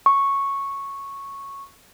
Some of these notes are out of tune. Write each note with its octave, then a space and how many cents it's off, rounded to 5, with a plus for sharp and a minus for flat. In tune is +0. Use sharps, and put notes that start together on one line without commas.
C#6 -5